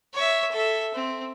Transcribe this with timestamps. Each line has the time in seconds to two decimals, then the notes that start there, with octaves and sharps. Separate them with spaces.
0.14 C#5 E5
0.51 A4 E5
0.94 C4